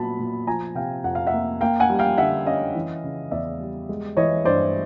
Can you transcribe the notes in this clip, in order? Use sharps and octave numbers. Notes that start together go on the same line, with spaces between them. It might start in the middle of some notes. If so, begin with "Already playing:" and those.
Already playing: A#2 F#3 B3 A5 B5
A#2
F3 G#5 A#5
C3 F5 G5
F2 F#5
F5
E5 F#5
A#3
A#3 F5 G5
F#5 G#5
G3
F5 G5
D3 E5 F#5
C#4 D#5 F5
E3
C#3
E2 D5 E5
G3
G#3
E3 C#5 D#5
G2 C5 D5